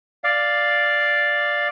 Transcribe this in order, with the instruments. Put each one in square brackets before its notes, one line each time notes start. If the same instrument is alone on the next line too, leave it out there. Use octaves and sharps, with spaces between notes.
[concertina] D5 F5